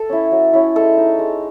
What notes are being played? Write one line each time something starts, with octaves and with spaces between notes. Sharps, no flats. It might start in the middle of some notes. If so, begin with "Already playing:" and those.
Already playing: A4
C#4 E4
F#3
C#4 E4
G#3 A4
D#4
G#3